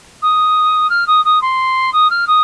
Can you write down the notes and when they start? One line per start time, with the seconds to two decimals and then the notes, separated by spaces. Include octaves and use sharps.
0.22 D#6
0.89 F6
1.07 D#6
1.24 D#6
1.41 C6
1.92 D#6
2.10 F6
2.27 D#6